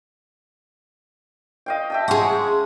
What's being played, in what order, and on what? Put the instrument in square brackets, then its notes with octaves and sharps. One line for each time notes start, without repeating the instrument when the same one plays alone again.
[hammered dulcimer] D#5 F5 G5
E5 G5 A5
[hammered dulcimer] G#3 C#4 [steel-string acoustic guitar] G#4 F#5